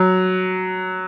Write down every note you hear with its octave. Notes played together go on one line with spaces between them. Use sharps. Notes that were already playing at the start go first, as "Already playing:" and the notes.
Already playing: F#3